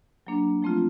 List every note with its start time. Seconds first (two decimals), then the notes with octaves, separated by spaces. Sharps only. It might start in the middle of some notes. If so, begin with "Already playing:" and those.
0.27 F#3 A#3 D4
0.62 F3 A3 C4 F4